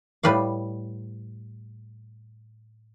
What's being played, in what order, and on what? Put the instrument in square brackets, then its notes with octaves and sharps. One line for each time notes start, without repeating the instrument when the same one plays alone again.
[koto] A2 G3 B4 D5 F5